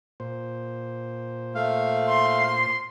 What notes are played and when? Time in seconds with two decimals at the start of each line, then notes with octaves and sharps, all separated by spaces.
0.20 A#2 C5
1.55 A3 F5
2.08 C6